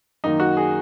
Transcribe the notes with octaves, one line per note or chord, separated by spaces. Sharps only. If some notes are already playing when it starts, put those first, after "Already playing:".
F#2 D#3 A#3 D#4
F#4
G#4